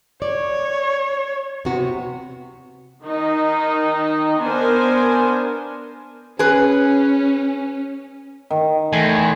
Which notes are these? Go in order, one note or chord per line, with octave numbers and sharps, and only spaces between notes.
C#5 D5
C3 B3 F#4
D#3 D#4
B3 D4 A#4 C5 G#5
C#4 G#4 B4
D#3
E2 A3 G#5 C6